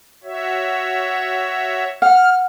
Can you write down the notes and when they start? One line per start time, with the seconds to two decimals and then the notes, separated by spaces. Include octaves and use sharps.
0.24 F#4 C#5 E5
2.02 F#5 F6